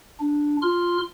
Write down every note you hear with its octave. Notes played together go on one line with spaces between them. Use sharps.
D4
F4 C6 F6